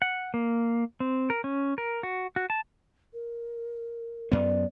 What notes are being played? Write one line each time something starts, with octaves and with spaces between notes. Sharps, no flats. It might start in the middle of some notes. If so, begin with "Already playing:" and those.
F#5
A#3
C4
A#4
C#4
A#4
F#4
F#4
A5
A#4
F#2 B3 D5